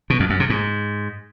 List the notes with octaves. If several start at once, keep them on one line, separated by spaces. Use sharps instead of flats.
B2
F2
F#2
C3
G#2